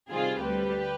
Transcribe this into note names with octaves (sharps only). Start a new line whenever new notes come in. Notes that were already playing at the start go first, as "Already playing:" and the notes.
C3 D#3 G3 C4 F4 G#4
D2 D3 G3 G4 B4